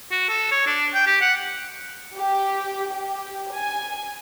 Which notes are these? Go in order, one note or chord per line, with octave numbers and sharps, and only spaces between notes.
F#4
A4
C#5
D4
G5
G4
F#5
G4
G4
G#5